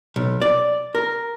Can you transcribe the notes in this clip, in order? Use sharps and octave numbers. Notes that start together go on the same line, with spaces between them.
B1
D5
A#4